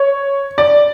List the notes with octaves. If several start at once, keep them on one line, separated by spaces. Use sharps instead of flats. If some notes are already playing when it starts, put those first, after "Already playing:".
Already playing: C#5
D5